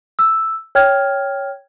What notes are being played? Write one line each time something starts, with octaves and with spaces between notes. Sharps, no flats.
E6
C#5 G5 F6 G#6